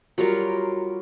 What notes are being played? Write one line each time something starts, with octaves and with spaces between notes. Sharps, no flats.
F#3 G3 F4 A#4